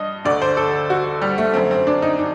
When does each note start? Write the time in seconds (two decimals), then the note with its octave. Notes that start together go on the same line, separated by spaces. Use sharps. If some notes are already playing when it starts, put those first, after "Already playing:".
Already playing: G2 D#5
0.25 D2 D3 D5
0.42 C5
0.57 A4
0.90 F#4
1.22 G3
1.38 A3
1.54 F#2 D3 C4
1.71 C4
1.87 D4
2.02 D#4
2.19 D4